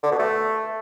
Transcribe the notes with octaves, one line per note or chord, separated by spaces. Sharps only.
D3
B2
A3